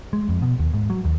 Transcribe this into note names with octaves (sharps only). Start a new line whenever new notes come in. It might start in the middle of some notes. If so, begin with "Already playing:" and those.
G#3
F2
B2
D#2
G#2
F#3
D#2